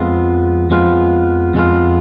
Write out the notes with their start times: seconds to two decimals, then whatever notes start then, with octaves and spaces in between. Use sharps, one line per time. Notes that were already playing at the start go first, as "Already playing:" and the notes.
Already playing: F2 F3 G#3 B3 F4
0.70 F2 F3 G#3 B3 F4
1.54 F2 F3 G#3 B3 F4